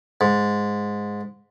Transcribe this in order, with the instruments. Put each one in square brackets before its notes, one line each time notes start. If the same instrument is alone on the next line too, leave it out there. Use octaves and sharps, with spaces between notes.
[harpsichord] G#2